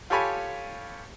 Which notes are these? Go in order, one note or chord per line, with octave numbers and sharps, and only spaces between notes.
F4 G4 A4 C#5 G#5 B5